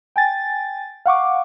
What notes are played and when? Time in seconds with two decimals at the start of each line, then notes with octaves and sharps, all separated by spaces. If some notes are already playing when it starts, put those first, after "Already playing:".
0.16 G5 G#5 A6
1.06 F5 F#5 C#6 D6